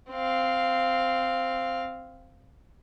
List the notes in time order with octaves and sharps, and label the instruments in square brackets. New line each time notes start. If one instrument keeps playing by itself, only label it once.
[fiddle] C4 F5